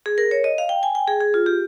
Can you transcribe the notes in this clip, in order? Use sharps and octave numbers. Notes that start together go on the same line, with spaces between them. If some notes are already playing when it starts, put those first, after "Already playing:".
G#4
A#4
C#5
D#5
F5
G5
G#5
G5
G#4
G#4
F4
G4